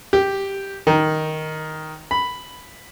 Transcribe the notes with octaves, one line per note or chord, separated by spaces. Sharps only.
G4
D#3
B5